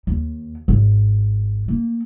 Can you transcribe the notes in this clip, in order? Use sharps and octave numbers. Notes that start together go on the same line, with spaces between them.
D#2
G#1
A#3